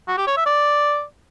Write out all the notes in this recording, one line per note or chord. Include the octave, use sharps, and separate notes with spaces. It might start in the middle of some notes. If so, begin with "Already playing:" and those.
F#4
G4
C#5
E5
D5